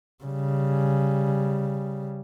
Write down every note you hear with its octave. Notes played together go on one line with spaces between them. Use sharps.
C#3 G3